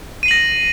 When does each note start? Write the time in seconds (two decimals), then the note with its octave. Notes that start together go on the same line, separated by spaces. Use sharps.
0.23 D#7
0.26 C7
0.28 F#7
0.31 A#6